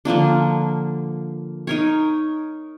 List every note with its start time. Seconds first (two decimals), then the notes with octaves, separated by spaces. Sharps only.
0.05 D3 F3 A#3 D4
1.67 D#4 A#4 C#5